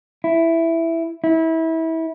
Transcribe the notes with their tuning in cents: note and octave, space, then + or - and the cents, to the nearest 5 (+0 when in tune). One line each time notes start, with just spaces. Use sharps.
E4 +5
E4 -25